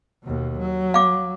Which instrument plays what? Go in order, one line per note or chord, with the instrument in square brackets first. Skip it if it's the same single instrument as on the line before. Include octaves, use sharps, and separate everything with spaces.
[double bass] D#2 B2
F#3
[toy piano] F5 D6